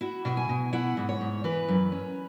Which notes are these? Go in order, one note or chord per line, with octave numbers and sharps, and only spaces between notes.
E4 F#4
B2
G#5
B2
E4 F#5
G#2
C#5
G#2
E3 B4
F#2
C#4